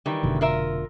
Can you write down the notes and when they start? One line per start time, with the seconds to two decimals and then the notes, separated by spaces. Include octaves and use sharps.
0.06 D#3 E3 G3
0.23 F1 B2 D3
0.41 F4 A#4 E5